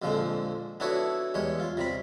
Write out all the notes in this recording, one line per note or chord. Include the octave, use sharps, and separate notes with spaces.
A#1 F2 D3 F3 G#3
B3 D4 E4 F#4 A4 C#5
E2 G3 G#3 C#5
F4
C3 G3 B5